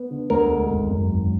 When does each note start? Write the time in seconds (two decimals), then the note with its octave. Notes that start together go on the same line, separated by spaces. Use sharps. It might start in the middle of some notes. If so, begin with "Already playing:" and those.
Already playing: B3
0.10 D3
0.30 D2 A#4
0.50 G#3
0.70 G#1
0.90 F#2
1.10 G#1